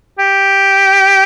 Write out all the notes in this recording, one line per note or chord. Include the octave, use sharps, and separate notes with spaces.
G4